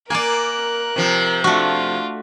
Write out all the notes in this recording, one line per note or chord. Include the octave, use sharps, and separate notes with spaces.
A#3 A#4 D5 G#5 F#6
C3 F3
A3 D4 F4 F#4